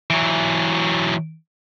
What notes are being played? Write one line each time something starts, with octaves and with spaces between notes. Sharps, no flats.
E3 F#3